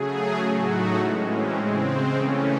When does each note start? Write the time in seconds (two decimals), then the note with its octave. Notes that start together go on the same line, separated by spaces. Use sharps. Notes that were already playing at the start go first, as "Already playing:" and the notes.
Already playing: C#3 F#3 A3 G#4
0.37 A2 F#3 A3 F#4
0.67 D#4
0.97 A2 E3 G#3 C#4
1.26 C4
1.56 C#3 G#3 C4
1.86 C4
2.16 C#3 E3 A3 C#4